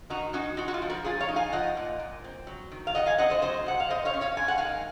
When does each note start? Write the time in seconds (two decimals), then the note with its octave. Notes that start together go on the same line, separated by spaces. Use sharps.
0.10 D#3 D#4 F#4
0.33 C#4 D#4 F#4
0.57 G#3 D#4 F#4
0.68 F#4
0.74 F4
0.82 F3
0.90 F#4 A#4
1.04 F3 F4 G#4
1.20 C#5 F5
1.28 D#4
1.36 F5 G#5
1.52 F3 D#5 F#5
1.77 A#2
2.00 A#2
2.24 C4
2.47 F#3
2.72 D#3
2.87 F5
2.95 D#4 D#5 F#5
3.06 F5 G#5
3.18 C4 D#5 F#5
3.30 C5 D#5
3.42 F#3 C5 D#5
3.66 C3 F#5
3.80 F5
3.89 C3 C5 D#5
4.05 C#5 F5
4.14 C#4
4.21 C#5 F5
4.37 G#3 G#5
4.48 F#5
4.58 D#3 F5 G#5